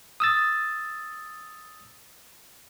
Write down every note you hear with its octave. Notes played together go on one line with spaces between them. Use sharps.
D#6 E6 A6